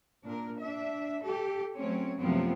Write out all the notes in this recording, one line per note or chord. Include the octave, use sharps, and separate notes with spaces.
A#2 D4 A#4
D4 E5
G4 A4
F#3 A3 C4 C#4 C#5
F#2 C3 F3 A3 B3 C4